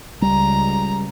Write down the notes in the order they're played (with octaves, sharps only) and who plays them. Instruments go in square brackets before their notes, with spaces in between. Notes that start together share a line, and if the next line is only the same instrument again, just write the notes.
[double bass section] C#2 [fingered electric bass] G3 [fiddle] A#5